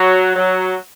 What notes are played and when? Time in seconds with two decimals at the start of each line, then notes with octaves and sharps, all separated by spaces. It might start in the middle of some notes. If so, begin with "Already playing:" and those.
Already playing: F#3
0.36 F#3